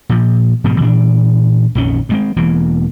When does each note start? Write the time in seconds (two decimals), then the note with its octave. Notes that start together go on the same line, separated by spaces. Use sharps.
0.09 A#2 F3
0.64 G#2 B2 D3 F3
0.80 A#2 E3 C#4 D4
1.75 A#1 F2 D#3 C#4
2.09 G2 G#3 C4
2.36 E1 E3 A#3